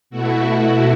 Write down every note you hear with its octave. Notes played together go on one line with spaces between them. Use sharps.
B2 A3 E4 F#4